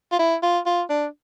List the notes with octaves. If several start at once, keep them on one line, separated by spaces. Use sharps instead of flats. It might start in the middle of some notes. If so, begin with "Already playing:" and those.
F4
E4
F4
F4
D4